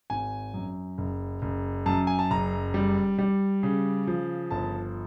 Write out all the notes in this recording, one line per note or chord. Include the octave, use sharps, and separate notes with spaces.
G#1 G#5
F#2
F#1
F#1
F#2 A5
G#5
A5
F#1 A#5
G3
G3
C#3
F3
G1 A5